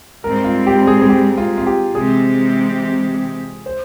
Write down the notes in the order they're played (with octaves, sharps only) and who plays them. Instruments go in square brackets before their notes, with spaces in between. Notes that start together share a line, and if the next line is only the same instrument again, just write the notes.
[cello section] G#2 G3 C4 [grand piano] A#4
[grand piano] F4
G4
G#4
G#4
G4
F4
F4
G4
[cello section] C3 E3 G#3 C4 G4 [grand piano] G#4
[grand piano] C5